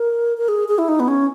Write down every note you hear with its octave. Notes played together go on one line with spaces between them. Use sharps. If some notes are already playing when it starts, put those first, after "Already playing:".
Already playing: A#4
A#4
G#4
G#4
E4
D#4
B3
C#4